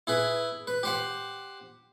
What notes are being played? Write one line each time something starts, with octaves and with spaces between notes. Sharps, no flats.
E4 G#4 B4
B4
G4 C5 F#5